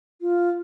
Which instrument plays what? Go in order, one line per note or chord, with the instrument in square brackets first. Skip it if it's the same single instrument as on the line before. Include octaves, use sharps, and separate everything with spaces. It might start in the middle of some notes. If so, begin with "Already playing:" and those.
[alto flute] F4